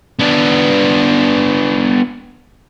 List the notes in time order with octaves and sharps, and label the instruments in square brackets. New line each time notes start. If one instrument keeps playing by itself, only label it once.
[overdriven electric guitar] B3 D4